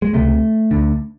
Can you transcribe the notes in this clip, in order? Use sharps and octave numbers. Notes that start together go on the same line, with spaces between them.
G#3
C#2 C3 A3
D2 D3